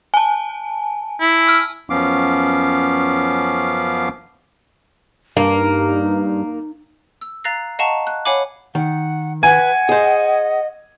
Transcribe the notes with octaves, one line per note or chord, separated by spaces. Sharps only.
G#5 A5
E4
E6 F6
F#2 F3 B3 C#4 F5 D6
G2 A#3
D#4
E6
F5 A#5 F#6 A6 A#6 C7
D#5 F5 F#5 A5 A#5 C#6
F#6
C#5 F5 F#5 G#5 B5 D6
D#3 F#5
B4 F#5 G#5
G#4 C5 D#5